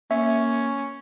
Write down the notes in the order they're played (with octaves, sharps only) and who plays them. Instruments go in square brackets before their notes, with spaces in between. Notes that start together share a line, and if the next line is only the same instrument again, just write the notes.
[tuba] A#3 [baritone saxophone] C#4 [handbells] E5